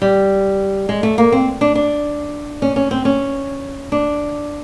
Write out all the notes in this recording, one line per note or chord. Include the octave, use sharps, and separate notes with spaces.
G3
G#3
A3
A#3
C4
D4
D4
C#4
C#4
C4
C#4
D4